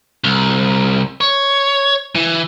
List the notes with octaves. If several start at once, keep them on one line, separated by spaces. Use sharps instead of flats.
C2
C#5
E3